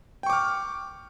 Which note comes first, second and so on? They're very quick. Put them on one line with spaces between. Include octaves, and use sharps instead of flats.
G5 C#6 D6 F6